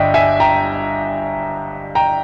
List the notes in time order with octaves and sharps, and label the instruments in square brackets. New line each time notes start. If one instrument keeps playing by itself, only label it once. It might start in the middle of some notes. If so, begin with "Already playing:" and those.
Already playing: [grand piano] G1 G2 G3 D#5 E5 G5
E5 G#5
G5 A#5
G5 A#5